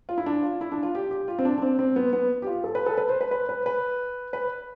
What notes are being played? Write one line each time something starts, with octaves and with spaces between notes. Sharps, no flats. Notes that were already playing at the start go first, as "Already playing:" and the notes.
F4
E4
D4
F4
E4
D4
F4
G4
G4
F4
C4
D4
D4
C4
C4
B3
B3
G4
F4
A4
B4
A4
B4
C5
B4
B4
B4
B4
B4